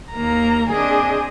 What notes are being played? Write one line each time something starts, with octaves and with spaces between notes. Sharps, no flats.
D#2 A#3 A#5
C4 D4 G#4 D#5 G#5